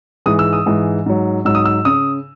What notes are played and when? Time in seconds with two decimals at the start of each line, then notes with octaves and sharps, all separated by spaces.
0.26 G#2 E3 G#3 D#6
0.39 E6
0.53 D#6
0.66 G#2 E3 G#3
1.06 G#2 F#3
1.45 G#2 F#3 E6
1.55 D#6
1.65 E6
1.85 C#3 D#6